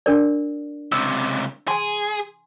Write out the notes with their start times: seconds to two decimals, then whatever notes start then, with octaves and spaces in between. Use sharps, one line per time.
0.06 D4 A#4 D5
0.92 C#2 C3 E6
1.68 G#4 G#5 C6